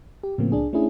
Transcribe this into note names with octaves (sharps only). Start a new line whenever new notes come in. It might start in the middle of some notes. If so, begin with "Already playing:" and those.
G4
A2 C#3 F3 A#3 C4
C2 D4 G#4
A3 C#4 D4 E4 G#4